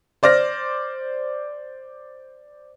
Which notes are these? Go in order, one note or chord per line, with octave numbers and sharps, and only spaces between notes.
C5 D5 F6 A#6